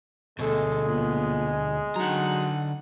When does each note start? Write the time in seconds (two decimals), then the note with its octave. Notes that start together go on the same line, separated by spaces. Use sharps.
0.39 D2 B2 G#3 A4
0.88 A#2 B3
1.96 D3 F#3 D#4 F#5 A#5